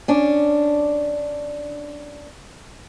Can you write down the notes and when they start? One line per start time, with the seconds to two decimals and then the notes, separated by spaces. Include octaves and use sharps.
0.08 C#4 D4